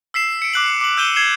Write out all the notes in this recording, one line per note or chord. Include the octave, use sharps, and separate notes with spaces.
E6 B6 C7 E7
C#7 D7
D6 F#6 F#7
D6 F#7
E6 F#6 G6 D#7 E7 G7
G#6 C7 E7 G7